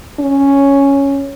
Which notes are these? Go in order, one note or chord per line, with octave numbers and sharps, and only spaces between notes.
C#4